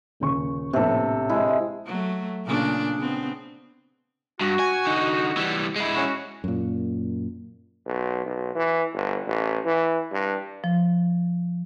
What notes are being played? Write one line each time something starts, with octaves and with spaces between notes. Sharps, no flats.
D#1 C#3 C#6
A#1 A2 C3 B3 A4
G#3 E4
F#3 A3
A#2 C#3 D4
C#3 B3 C4
G2 F#4
G#5
D3 D#4
E3 G3
G#3 E4
C#4 F#4
F#2 A#2
B1
B1
E3
G1
A1
E3
G2
F3